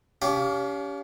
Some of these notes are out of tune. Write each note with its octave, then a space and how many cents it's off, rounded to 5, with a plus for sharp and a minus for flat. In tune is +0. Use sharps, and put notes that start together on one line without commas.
C#4 +40 G4 +0 F5 +0